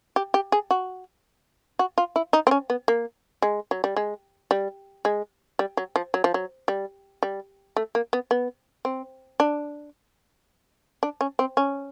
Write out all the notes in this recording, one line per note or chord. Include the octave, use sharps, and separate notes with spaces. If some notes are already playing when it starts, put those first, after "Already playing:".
G4
G4
G#4
F#4
F#4
F4
E4
D#4
C4
C#4
B3
A#3
G#3
F#3
G3
G#3
G3
G#3
G3
F#3
F3
F#3
F3
F#3
G3
G3
A3
A#3
B3
B3
C4
D4
D4
C#4
C4
C#4